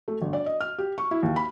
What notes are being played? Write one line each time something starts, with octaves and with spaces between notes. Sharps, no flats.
A3
G1
D5
D#5
F6
G4
C#6
E4
D#2
B5